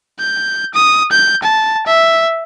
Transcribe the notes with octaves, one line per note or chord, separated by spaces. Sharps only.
G6
D#6
G6
A5
E5